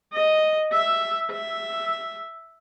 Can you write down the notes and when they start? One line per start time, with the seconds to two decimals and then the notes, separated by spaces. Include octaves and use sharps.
0.14 D#5
0.73 E5
1.32 E5